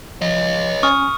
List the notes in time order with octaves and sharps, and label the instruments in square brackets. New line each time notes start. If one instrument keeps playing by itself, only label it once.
[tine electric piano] F3 [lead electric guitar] C#5 D#5
[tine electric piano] C#4 G#5 [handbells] C#6 D#6 F6